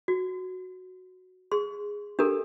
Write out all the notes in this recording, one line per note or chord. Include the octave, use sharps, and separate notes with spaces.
F#4
G#4 C6
D4 G4 A4 A#4